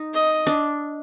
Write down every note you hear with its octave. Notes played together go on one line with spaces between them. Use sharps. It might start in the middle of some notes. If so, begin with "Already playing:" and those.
Already playing: D#4
D#5
D4